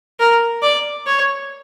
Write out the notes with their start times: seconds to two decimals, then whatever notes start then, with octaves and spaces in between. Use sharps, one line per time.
0.20 A#4
0.63 D5
1.07 C#5